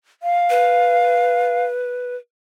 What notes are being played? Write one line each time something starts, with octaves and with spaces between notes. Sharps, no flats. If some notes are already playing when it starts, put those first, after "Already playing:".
F5
B4